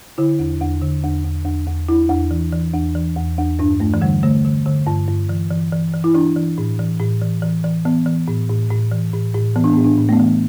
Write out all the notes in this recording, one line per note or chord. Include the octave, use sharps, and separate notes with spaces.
D3 E4
E2
E2
D3
E2
E2
E2
E2
E2 E4
E2
E3
E3
E2
E3
E2
E2
G2 D4
G2 A3
E3
D3 G3
D3 A3
D3
D3
G2
G2
E3
E3
E3
E3
E4
E3 D4
E3
A2
E3
A2
E3
E3
E3
E3 B3
E3
A2
A2
A2
E3
A2
A2
E3 B3
D4
A2 B3
D4
A2
A3
B3
E3